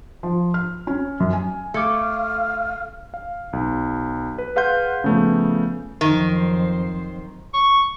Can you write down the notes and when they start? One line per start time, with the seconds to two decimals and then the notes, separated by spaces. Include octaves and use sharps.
0.23 F3
0.54 F6
0.87 C#4
1.20 F#2
1.33 G#5
1.74 A3 F5 D6 G#6 C#7
3.14 F5
3.53 B1
4.38 B4
4.56 G#4 B4 F5 F#5 C6 G6
5.04 C#3 F3 A3 B3
6.01 F2 D#3 F#3 C5
7.54 C#6